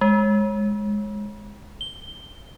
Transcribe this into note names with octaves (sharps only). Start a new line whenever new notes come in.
G#3
G7